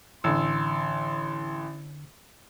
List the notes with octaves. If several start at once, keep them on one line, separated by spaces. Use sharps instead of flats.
A1 D3 C6 E6